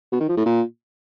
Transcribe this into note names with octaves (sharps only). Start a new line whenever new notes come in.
B2
D#3
F3
A2
A#2